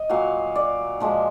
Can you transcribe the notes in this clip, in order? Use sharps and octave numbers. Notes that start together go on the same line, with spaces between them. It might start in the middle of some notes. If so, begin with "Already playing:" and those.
Already playing: D#5
A#2 F#3 F5
D5
A#2 F3 G#3